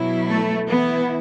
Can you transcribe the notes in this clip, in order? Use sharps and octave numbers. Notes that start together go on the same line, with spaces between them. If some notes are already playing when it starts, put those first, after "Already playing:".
Already playing: B2 F#3 E4
A3 A4
E3 B3 E4